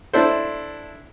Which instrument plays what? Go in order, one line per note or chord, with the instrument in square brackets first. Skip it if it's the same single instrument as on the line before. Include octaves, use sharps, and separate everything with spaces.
[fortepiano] D4 E4 A4 C5